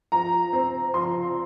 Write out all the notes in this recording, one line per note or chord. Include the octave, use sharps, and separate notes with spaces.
F3 A#5
C4
F3 C6